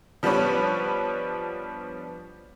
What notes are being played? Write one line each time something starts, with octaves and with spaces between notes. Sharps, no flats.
F3 G3 B3 D4 B4 C#5